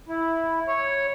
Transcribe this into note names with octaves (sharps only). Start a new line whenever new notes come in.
E4
C#5